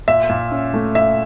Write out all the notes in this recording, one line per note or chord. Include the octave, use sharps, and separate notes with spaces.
A#2 E5
A#2
C#4
A3
A#2 E5